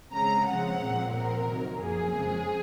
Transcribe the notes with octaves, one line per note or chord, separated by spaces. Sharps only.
C#3 G#3 C4 A#5
C#3 F3 G#3 C4 F#5
A#2 F3 C4
A#2 F3 C4 A#4
C3 D#3 F#3
F#2 F3 A#3 G#4
F2 C#3 F3 G#3 C4